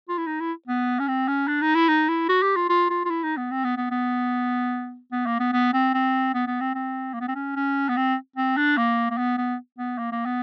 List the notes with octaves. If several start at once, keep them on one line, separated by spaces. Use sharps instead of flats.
F4
E4
D#4
E4
B3
C#4
C4
C#4
D4
D#4
E4
D#4
E4
F#4
G4
F4
F4
F4
F4
E4
D#4
B3
C4
B3
B3
B3
B3
A#3
B3
B3
C4
C4
B3
B3
C4
C4
A#3
B3
C4
C#4
C#4
B3
C4
C4
D4
A#3
A#3
B3
B3
B3
A#3
A#3
B3